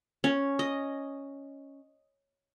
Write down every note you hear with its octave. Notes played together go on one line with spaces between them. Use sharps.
C#4
D#5